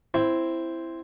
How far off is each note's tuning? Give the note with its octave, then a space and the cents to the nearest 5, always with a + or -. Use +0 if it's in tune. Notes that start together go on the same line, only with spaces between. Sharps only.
C4 +0 E4 +10